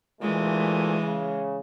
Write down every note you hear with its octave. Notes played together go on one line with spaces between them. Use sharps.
D2 A#2 E3 G#3 A3
C#3